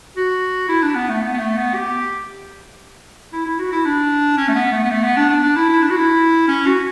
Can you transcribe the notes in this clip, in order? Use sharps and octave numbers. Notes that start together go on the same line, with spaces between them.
F#4
E4
D4
B3
A3
B3
B3
A3
B3
G4
E4
E4
F#4
E4
D4
C#4
A3
B3
A3
B3
A3
B3
D4
D4
D4
E4
E4
D4
F#4
E4
C#4
F#4